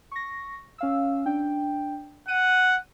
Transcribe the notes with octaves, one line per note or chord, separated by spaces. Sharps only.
C#6 A#6
C#4 F5 E6
D4 G5
F#5 D#7